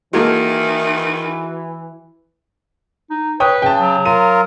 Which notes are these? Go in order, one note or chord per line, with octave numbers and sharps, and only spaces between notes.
D#3 E3 G#3 A#3 E4 F#4 A4 G#6
D#4
B4 C#5 G5 D#6
C#3 G5 A5
F#3
F4 A#4 D#7